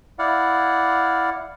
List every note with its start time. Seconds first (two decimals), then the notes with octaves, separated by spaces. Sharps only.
0.19 E4 D5 F5 F#5